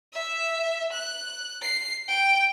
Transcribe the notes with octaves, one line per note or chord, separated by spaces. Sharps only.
E5
F#6
C7
G5